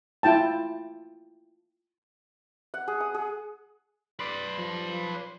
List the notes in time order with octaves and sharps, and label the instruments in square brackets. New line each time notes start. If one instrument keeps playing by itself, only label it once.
[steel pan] E4 F4 G5 A5
[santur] F#5
G#4
D#6
G#4
[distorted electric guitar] B4 D5 [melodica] B5 C6
[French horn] F3